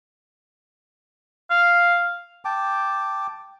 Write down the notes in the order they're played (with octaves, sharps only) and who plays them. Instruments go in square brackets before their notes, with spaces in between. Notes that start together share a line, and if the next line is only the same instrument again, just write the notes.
[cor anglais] F5
[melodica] G5 A5 D6